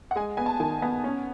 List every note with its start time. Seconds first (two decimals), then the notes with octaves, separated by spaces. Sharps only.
0.11 F#5
0.16 G#3 G#5
0.37 B3 G#5
0.46 A5
0.60 D#3 G#5
0.82 B3 G#5
1.04 C#4